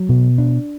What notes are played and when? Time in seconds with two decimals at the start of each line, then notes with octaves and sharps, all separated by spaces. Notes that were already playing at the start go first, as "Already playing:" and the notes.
Already playing: F#3
0.09 B2
0.38 D4